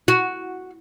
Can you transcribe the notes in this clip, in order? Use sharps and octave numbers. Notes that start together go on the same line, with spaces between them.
F#4